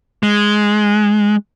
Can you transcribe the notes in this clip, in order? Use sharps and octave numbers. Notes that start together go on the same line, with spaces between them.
G#3